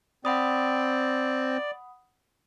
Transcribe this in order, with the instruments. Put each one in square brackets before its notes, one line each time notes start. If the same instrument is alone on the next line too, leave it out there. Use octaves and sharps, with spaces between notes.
[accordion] C4 [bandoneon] D5 [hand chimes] F#5 B5 D#6